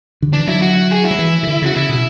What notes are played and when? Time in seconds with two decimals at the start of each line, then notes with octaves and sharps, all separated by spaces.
0.22 D3
0.33 E3 D4
0.47 F#3 E4
0.62 F#4
0.91 G#4
1.04 E4
1.11 F#3
1.19 E3
1.43 C#3
1.47 D3
1.62 C#3 F#4
1.76 C#3 E4
1.89 B2